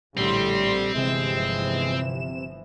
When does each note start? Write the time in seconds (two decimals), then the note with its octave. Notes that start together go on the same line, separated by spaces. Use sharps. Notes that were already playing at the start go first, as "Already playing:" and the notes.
0.17 A#1 A2 D3 G3 C4 C6
0.95 G1 C3 E3 F3 G#3 E7